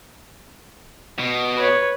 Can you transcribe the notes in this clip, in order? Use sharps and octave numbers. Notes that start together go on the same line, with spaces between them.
B2
B4 C#5